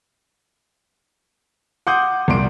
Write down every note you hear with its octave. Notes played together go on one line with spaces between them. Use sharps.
F#5 C6 D6 D#6 G6
C2 A#2 C6 D7